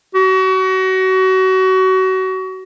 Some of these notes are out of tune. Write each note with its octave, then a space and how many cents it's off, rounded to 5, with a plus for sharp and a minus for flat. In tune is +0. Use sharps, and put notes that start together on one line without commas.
F#4 +30